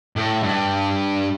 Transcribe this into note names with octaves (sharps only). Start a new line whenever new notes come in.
A2
G2